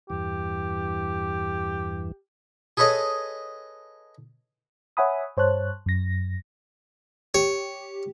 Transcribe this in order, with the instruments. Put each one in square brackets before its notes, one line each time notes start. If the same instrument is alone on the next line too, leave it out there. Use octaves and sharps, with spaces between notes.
[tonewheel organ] E2 G2 E3 [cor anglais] G4
[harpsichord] G#4 A4 B4 C#5 D#5
[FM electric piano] C#5 E5 F#5 G#5 B5 D#6
G2 C5 C#5 A5 F#6
F#2 A#6
[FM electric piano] G4 [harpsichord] C#5